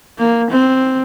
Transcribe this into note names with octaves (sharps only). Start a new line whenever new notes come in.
A#3
C4